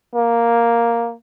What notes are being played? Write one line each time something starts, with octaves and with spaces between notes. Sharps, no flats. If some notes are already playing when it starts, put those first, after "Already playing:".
A#3